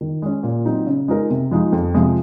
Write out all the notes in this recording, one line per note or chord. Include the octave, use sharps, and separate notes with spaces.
D#3
G#3 C#4
A#2
F#3 C4 D#4
C#3
G#3 D#4 A#4
C3
F3 G#3 D#4
F2
C3 F3 G#3